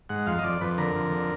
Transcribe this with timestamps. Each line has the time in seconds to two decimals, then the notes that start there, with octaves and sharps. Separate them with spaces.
0.09 G#2 F#5
0.27 F2 F5
0.38 D#5
0.44 F2 D5
0.61 F2 B4
0.78 D3 A#4
0.95 F2
1.12 D3